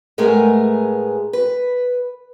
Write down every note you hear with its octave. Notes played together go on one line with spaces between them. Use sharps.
A2 G#3 A3 B3 G#4 A#4
B4